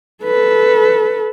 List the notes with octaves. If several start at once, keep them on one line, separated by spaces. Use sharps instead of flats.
A4 B4